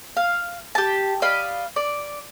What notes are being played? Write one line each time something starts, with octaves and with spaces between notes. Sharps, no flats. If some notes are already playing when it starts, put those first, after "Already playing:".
F5
G4 A5
D5 D#5 F5 B5
D5